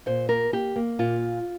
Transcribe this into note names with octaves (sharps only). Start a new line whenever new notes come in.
A#2 C5
A#3 A#4
A#3 G4
A#3
A#2 F4